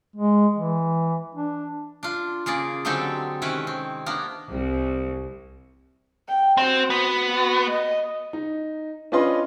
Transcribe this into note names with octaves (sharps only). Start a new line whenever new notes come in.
G#3
E3
D4
D4 F4
C#3 A#3 G#4 D5
D3 F#3 G#3 C4 G4 A4
C3 D#3 C#4 E4 B4
C4
A#3 B3 D4
C2
G5
C4 F#4
B3
F#4
D#5
D#4
C#4 D4 F4 B4 D#5 C6